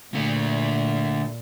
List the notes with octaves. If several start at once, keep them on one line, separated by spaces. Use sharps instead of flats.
A#2 D3 A3